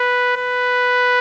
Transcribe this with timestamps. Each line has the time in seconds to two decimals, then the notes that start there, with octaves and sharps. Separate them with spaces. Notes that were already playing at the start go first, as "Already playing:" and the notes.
Already playing: B4
0.37 B4